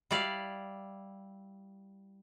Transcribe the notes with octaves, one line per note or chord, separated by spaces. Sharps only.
G3 E4 D5 F5